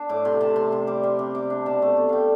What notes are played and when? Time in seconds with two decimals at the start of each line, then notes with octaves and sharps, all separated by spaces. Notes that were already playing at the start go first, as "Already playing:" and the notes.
Already playing: D4 A5
0.09 A2 D6
0.25 C3 C6
0.41 C3 A5
0.56 C3 C6
0.72 C3 C6
0.87 G3 D6
1.03 G3 C6
1.19 C3
1.35 C3 D6
1.50 D4 C6
1.66 B2 A5
1.82 A3
1.97 A3
2.09 G3 F5 G5